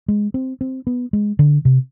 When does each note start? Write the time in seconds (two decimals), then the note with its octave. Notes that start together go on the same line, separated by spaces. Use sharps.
0.08 G#3
0.34 C4
0.61 C4
0.87 B3
1.13 G#3
1.39 D3
1.65 C3